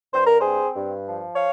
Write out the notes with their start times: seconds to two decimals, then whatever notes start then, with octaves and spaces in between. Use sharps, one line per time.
0.14 G2 C5
0.27 A#4
0.39 G#4 C5
0.45 C4
0.75 G2
1.06 F3
1.36 C#5 F5